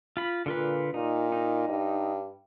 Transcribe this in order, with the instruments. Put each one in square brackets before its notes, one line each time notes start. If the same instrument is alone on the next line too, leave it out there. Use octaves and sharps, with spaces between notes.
[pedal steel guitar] F4 B5
[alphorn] A#2 [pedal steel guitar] D3 F4 B4
[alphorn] A#2 [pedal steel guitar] D#4
[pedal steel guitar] D#4
[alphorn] G2